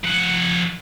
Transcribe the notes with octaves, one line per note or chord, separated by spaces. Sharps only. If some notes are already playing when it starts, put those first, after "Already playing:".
F3 F#5